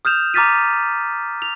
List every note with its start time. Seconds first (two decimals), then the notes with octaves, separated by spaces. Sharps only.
0.05 D#6 F6 G6 E7 F7
0.34 A#5 D6 F6 A6 B6 D#7
1.42 F7